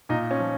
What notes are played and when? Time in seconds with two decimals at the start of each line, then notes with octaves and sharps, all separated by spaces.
0.09 A#2 D#4
0.31 C#4
0.40 F3